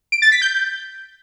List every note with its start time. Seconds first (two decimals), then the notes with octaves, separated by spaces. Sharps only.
0.12 D7
0.22 A6
0.32 B6
0.42 G6